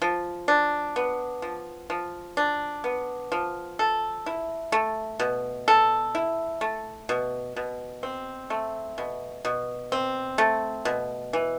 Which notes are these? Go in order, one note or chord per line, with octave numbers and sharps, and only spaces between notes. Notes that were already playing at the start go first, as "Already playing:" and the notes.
F3
D4
B3
F3
F3
D4
B3
F3
A4
E4
A3
B2
A4
E4
A3
B2
B2
C4
A3
B2
B2
C4
A3
B2
E3